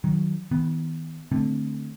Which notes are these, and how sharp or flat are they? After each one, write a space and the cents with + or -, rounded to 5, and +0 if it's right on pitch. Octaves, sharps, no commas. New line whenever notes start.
D#3 +0 F#3 +0
D#3 +45 B3 +0
D3 +5 A3 +0 C4 +0